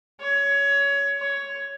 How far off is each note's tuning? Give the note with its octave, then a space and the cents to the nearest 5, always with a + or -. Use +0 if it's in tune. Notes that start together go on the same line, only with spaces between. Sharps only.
C#5 +20
C#5 +10